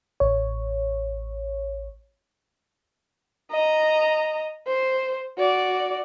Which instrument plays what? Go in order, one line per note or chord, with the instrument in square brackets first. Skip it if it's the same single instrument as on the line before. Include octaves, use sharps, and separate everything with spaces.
[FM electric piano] A1 C#5
[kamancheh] D#5 A#5
C5
F#4 D5